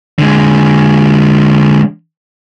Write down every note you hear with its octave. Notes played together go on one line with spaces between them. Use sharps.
D3 G#3